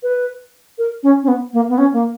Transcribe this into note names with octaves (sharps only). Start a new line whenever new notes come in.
B4
A#4
C#4
C#4
B3
A#3
B3
C#4
A#3